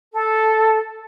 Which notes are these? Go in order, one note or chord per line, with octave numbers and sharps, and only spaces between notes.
A4